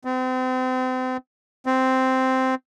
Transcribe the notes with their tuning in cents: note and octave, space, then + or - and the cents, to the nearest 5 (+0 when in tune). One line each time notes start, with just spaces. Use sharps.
C4 -35
C4 -5